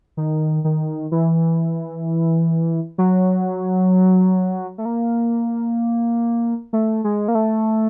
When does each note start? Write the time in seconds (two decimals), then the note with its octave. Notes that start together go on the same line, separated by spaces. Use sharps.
0.17 D#3
0.64 D#3
1.12 E3
2.98 F#3
4.78 A3
4.85 A#3
6.73 A3
7.04 G#3
7.28 A#3
7.35 A3